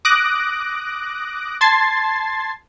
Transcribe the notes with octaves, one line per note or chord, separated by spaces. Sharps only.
D6 D#6 F#6 A#6 D7
A5 C6 G#6 A6 C7